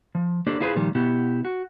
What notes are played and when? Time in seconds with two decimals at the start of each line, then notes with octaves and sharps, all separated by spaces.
0.15 F3
0.47 A#3 D4 G4 A4 C5 D5
0.60 E4 F4 G#4 B4 C5
0.76 A#2 D#3 F3 G3
0.95 B2 B3 E4 G4
1.45 F#4